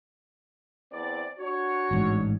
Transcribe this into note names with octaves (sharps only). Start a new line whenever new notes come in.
E2 C4 D5
D4 F#4 C#5
A1 G#2